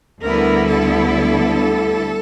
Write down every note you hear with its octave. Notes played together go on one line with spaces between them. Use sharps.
D2 D3 G3 B3 E4 A#4
A4